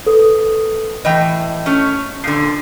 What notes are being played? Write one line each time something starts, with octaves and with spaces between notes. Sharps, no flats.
A4 B4 D#6
A2 E3 D#5 G5
A3 C#4
A#2 D3 D4 C7